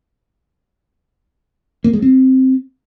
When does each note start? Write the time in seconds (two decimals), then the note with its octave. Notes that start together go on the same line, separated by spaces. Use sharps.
1.84 A#3
1.93 G#3
2.02 C4